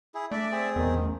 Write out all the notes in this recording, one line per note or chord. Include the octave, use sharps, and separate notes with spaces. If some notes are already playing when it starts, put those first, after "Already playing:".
E4 G#4
A3 D4 D5 E5
C4 G#4
D#1 A1 E2 D#3 B3
A1 A3 C#4